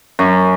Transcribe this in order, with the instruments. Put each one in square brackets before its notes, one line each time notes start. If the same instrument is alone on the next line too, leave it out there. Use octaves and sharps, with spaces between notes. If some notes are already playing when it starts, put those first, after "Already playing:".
[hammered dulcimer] F#2